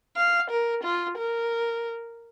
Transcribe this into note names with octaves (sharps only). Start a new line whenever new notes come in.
F5
A#4
F4
A#4